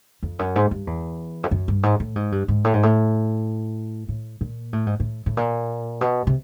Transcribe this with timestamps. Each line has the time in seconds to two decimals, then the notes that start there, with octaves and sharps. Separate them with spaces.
0.23 F2
0.39 F#2
0.56 G#2
0.71 G2
0.87 E2
1.43 F2
1.51 F#2
1.68 G2
1.83 G#2
2.00 A2
2.16 G#2
2.32 G2
2.48 G#2
2.64 A2
2.73 G#2
2.83 A2
4.09 A2
4.41 A#2
4.73 A2
4.87 G#2
5.00 A2
5.26 A2
5.37 A#2
6.01 B2
6.27 C3